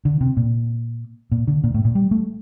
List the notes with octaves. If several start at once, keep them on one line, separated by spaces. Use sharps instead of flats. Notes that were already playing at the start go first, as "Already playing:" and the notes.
D3
C3
A#2
A#2
D3
A#2
A2
A#2
G3
A3